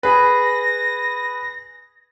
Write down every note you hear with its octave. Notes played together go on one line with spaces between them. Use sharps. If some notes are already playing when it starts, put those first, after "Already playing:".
G#4 B4 A#6